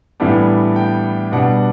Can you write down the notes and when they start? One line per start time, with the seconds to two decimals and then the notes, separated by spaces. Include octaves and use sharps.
0.20 A2 E3 G3 B3 D4
0.76 G5
1.32 B2 G3 D4 F#5